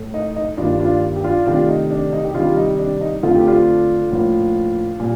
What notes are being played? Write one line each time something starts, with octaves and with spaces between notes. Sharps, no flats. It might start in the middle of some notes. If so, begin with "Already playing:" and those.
Already playing: A2 A3
D#4
D#4
G2 D#3 G3 A#3 D4 F4
D4 F4
G4
D4 F4
C3 D#3 A3 D4 F4
D#4
D4
D#4
G4
C3 D#3 G3 D4 F4
D#4
D4
D#4
F2 D3 F3 A3 F4
G4
D4 F4
A2 F3 A#3
A#2 G3